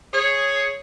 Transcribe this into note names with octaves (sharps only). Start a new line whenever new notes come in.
G#4 C#5